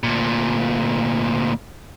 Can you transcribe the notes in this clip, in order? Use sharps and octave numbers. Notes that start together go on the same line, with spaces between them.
D2 A#2